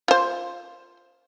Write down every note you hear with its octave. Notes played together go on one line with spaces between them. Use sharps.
F4 C5